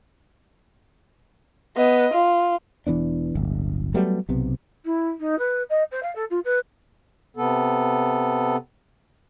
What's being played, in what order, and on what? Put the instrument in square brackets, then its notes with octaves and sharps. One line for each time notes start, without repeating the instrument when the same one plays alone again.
[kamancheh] B3 D#5
F4
[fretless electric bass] E1 E3 B3 D4
D1 G1
F#3 G3 A3 B3
B1 C3 B3
[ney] E4
D#4
B4
D#5
C5
F5
A4
F4
B4
[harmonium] C3 B3 A4